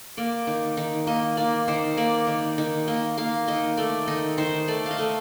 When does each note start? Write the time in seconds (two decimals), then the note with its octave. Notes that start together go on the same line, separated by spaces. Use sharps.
0.17 A#3 D5
0.47 D#3
0.77 D#3
1.07 A#3 D#5
1.37 A#3 D5
1.68 D#3 C5
1.97 A#3 D5
2.27 D#3
2.58 D#3
2.88 A#3 D#5
3.18 A#3 F5
3.48 D#3 D#5
3.77 A3 D5
4.07 D#3 D#5
4.38 D#3 C5
4.68 A3 D5
4.86 D#5 F5
4.98 A3